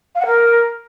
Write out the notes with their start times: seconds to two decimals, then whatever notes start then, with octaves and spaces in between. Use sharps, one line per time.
0.15 F5
0.20 F#5
0.26 A#4